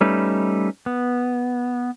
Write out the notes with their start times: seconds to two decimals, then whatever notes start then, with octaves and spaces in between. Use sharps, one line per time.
0.01 G3 A3 C#4 D#4 B4
0.86 B3